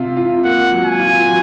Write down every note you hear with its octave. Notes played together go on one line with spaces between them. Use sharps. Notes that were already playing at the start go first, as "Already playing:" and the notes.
Already playing: C3 F4
F4
A#3 F#5
F#3
G#5
F4
F#3